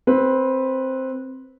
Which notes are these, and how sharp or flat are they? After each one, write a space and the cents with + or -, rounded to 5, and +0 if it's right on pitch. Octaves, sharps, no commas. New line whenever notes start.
C4 +5 B4 -10